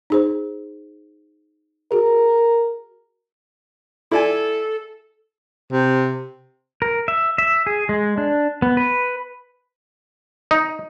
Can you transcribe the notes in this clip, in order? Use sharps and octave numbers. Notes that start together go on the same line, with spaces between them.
D#4 G#4 C5
F#4 G#4 A#4
E4 A4 D5 G#5
C3
A#4
E5
E5
G#4
G#3
D4
B3
B4
D#4